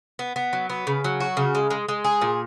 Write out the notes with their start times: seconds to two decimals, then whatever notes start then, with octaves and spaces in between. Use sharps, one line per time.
0.19 B3
0.36 B3
0.53 F#3
0.70 B3
0.87 C#3
1.04 F#3
1.20 F#4
1.37 C#3
1.55 G#3
1.70 G#3
1.88 G#3
2.05 G#4
2.21 A#2